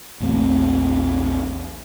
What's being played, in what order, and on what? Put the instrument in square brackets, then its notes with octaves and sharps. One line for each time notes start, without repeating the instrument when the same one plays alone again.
[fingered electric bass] A#1 E2 A3 C4